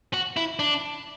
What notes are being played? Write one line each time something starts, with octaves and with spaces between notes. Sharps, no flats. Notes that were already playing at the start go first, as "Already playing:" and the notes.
F#4
E4
D4